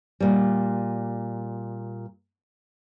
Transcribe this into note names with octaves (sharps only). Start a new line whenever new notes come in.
A#2 G3